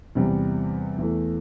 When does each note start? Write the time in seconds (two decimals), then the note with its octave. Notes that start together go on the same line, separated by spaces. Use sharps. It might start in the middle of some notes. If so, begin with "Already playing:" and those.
0.15 E2 C3 G3
0.98 E2 E3 A3